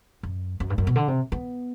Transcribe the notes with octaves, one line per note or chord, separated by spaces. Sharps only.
F#2
F#2
G2
F#2
B2
D3
C3
B3